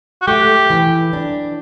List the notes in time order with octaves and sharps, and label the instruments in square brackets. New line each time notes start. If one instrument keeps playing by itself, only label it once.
[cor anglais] F#4
[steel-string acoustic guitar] A3 [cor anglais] G4
[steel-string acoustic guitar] E3
D4